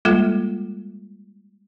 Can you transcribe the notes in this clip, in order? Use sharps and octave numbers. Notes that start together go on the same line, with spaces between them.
G3 G#3 A#3 F4 A4